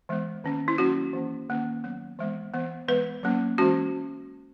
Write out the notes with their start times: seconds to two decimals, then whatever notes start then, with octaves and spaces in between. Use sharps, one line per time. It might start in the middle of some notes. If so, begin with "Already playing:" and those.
0.09 E3 G#3 B3
0.44 D#3 A#3 C#4
0.68 E4
0.78 F#3 A#3 C#4 F#4
1.13 E3 A#3 C#4
1.49 D#3 A#3 C#4
1.84 F#3 B3
2.19 E3 G#3 B3
2.54 E3 B3
2.88 E3 G#3 B3 B4
3.23 F#3 A#3 C#4
3.58 E3 G#3 C#4 F#4